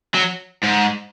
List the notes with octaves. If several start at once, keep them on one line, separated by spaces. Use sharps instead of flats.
F#3
G#2